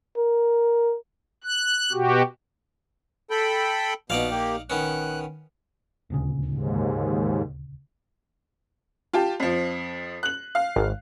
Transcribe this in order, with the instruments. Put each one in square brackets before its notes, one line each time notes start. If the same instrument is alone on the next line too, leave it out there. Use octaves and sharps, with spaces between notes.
[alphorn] A#4
[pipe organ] F#6
B2 F#4 G4
[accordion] A4 G5 B5
[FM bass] A#1 [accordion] B2 [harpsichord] D#4 D5 F5
[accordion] A#3 G4
[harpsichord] D#3 B3 C#4 [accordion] F#6
[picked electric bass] D#1 D2 C#3
[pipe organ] D#2 G#2
[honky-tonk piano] F4 G4 A5
F2 F3
F#6 F#7
F5
[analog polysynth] G#1